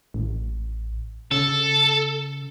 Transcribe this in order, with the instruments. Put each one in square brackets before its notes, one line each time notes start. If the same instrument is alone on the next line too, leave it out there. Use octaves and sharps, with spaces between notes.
[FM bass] A1
[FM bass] C#3 [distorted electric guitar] A4